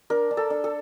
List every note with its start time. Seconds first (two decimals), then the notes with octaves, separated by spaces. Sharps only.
0.10 D4 A#4
0.31 D4
0.37 A4
0.50 D4
0.64 A4